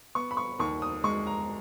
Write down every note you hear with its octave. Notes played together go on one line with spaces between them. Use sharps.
B3 C#6
B5
C#6
D#2 C#6
D#6
G#3 C#6
A#5